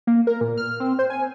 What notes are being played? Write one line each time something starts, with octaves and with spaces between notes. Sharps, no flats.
A#3
A#4
A#2
F6
C4
C5
G#5